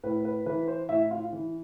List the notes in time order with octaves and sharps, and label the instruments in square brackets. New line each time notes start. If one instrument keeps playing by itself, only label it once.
[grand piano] A2 B4
B4
E3 B4
C5
A2 E4 E5
F4 F5
E3